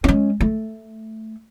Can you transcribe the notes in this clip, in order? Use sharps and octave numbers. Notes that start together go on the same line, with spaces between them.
G#3 C#4
A3